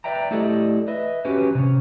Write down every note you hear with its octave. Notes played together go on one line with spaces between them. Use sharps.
B4 D5 E5 G5 A#5
A3 E4 G4 A4 D5 D#5
B4 D#5 E5
C#4 F#4 G4 B4
C3 C#4